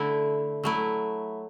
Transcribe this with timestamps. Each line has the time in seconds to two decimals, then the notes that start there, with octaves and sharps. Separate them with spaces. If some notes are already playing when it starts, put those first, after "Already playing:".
Already playing: D3 A3 E4
0.64 F#3 A3 E4